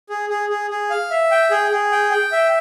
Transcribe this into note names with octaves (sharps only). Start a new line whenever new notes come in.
G#4
G#4
G#4
G#4
F5
E5
G5
G#4
G#4
G5
G5
E5